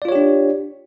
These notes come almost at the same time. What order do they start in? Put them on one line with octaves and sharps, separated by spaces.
D5 F4 C#5 G4 D4